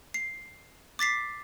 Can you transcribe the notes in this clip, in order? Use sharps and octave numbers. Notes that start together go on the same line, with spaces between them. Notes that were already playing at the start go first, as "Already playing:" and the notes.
C7
D6 A6 B6 C7